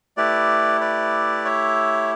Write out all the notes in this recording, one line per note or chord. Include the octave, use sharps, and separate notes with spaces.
A3 E4 G4 B4 D5
B4 D5
C#5 E5